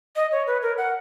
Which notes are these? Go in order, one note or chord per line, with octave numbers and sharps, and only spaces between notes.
D#5
C#5
B4
A#4
F#5